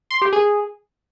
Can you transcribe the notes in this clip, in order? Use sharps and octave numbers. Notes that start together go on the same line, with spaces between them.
C6
G4
G#4